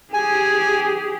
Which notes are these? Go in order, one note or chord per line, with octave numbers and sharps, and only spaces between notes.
G4 G#4 G#5